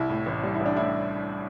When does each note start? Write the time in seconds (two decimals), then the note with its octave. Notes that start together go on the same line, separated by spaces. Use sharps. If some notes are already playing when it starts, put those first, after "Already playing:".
Already playing: C2 E4
0.09 A2
0.26 A1
0.43 G3
0.55 E4
0.60 A1
0.66 D4
0.76 A2 E4